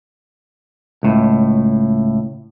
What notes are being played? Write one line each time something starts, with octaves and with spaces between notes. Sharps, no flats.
C#2 A2